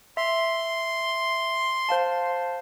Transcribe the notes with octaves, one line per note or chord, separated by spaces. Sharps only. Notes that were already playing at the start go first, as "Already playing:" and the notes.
E5 C6
C5 F5 A5